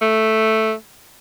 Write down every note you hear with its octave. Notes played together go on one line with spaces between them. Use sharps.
A3